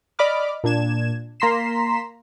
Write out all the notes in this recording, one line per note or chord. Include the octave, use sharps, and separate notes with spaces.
D5 D#5 B5 D6 F6
A#2 D4 G#6 E7
A#3 A#5 C6 B6 C7 E7